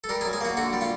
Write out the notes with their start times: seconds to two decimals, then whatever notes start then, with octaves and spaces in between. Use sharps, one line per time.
0.04 A4
0.09 G3 A#4
0.21 G#4
0.25 F#2
0.33 G#4
0.41 A#3 F#4
0.57 D3 F#4
0.73 G3
0.81 F4